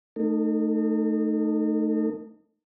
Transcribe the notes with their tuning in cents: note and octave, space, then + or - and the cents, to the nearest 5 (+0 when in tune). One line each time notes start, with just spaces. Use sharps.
A3 +0 D#4 -15 A#4 -45